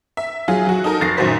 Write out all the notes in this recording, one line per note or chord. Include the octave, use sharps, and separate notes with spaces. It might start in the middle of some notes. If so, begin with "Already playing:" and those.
E5
F#3 F4 G#4
F#3 F#4
D#4 A4 A#4
F1 A6 A#6 C7
F#2 A#2 D#3 F#4 C5 B6